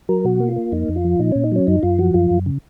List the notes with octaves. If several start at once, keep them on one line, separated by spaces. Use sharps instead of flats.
F#3 A#4
B2 F#4
A#3
F4
A#3
F2 D#4
F2
F4
F3
A#2 D#4
A#2 C#4
D#4
F#3 C#4
F#2 D#4
F#2 F4
F3 F#4
F#2 F4
F#2
C#3